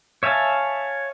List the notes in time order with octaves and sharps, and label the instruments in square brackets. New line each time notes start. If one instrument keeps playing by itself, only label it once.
[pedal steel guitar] C#5 E5 F5 G#5 A5